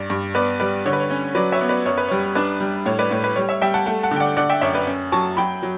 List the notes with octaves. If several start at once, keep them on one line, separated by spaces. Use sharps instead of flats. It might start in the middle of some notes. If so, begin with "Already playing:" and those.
Already playing: G2 D5
G2
B3 B4 D5
G3 B4 D5
D3 C#5
B4
C#5
C#4
F#3 B4 D5
C#5 E5
B3
B4 D5
F#2 C#5
B4
G3 C#5
D4 B4 D5
G3
A2 C#5
B4 D5
A2 C#5
B4
G3 C#5
C#5 E5
G3 E5 G5
F#5 A5
A3 F#5 A5
F#5 A5
D3 G5
D5 F#5
D3 D5 F#5
E5 G5
F#2 C#5 E5
B4 D5
C#4
F#3 A5 C#6
F#3 G5 B5
F#3